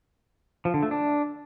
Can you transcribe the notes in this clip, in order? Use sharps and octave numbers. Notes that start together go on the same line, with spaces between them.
F3
D3
A3
D4